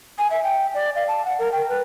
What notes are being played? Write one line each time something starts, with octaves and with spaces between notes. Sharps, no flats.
G#5
E5
G5
D5
F5
A5
F#5
A#4
G5
B4